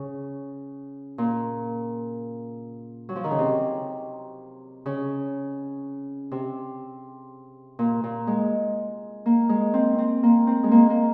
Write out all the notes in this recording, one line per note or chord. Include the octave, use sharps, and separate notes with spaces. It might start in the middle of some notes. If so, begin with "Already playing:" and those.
Already playing: C#3
A#2
F#3
F3
D#3
C#3
C3
C#3
C3
A#2
A#2
G#3
A#3
G#3
C4
C4
A#3
C4
G#3
A#3
A#3